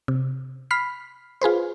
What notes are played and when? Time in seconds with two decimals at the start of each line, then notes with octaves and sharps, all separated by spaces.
0.08 C3
0.71 B5 F6 B6 C7
1.42 F4 G#4 B4 C5